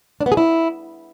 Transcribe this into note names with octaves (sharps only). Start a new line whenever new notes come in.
D4
B3
G#4
E4